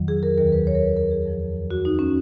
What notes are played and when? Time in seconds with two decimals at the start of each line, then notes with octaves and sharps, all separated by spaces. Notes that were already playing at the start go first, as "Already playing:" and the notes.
Already playing: F2 D#3 F#3
0.08 G#4
0.23 A#4
0.38 D#2 D#3 F#3 A#4
0.52 B4
0.67 C#5
0.75 A#4
0.82 B4
0.96 A#4
1.11 G#4
1.26 F2 F3
1.71 F#4
1.85 D#4
1.99 C#4